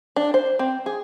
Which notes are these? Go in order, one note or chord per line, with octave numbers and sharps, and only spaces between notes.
D4
C5
C4
G#4